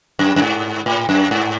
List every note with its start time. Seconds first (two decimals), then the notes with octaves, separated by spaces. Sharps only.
0.19 F#2
0.36 F#2
0.42 G#2
0.86 A2
1.09 F#2
1.31 G#2